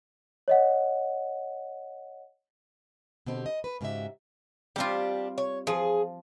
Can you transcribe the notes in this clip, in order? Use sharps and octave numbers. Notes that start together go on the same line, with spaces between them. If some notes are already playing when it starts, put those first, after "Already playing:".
C#5 D#5 F#5
B2 D3 C4 G4
D#5
B4
G#2 C#3 B3 F#4 G4 E5
G3 C4 D4 F4 G4
C#5
F3 G#4